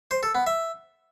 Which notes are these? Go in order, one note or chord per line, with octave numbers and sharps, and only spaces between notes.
C5
A4
B3
E5